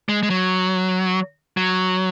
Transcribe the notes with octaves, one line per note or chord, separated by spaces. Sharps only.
G#3
G#3
F#3
F#3